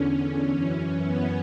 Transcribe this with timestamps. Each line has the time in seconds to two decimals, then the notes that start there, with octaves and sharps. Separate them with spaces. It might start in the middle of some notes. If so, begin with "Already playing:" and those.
Already playing: E2 D3 C#4
0.51 F#2 E3
1.03 B3